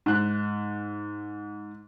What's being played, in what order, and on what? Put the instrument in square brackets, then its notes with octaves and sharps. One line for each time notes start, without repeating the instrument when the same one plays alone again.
[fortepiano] G#2 F#6